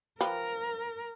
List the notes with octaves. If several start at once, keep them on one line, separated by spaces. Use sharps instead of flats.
F3 G4 A#4 B4